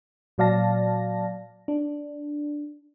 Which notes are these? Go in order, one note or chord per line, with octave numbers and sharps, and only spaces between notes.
A#2 F#3 D5 F5 A5 A#6
D4